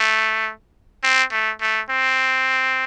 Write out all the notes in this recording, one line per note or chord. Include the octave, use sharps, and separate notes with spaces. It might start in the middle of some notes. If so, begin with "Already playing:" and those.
Already playing: A3
C4
A3
A3
C4